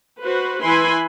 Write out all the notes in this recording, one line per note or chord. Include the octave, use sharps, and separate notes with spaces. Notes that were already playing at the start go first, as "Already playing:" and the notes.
F#4 B4 C5
E3 E4 B4 G#5 B5 C6